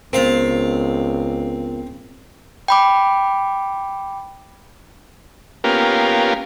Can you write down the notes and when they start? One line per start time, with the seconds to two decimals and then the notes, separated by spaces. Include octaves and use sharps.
0.13 C#2 B3 C4 A#4 F5
2.68 G5 B5 D6
5.64 A#3 B3 C#4 F4 G4 A#4